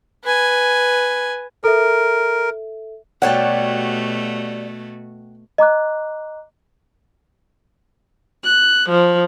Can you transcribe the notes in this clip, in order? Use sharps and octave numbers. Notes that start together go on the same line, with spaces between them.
B4 G#5
A4 A#4 E5
B2 G3 A3 F#4 C#5 F#5 G5 A5
D#5 A#5 D6 F#6
F#6
F3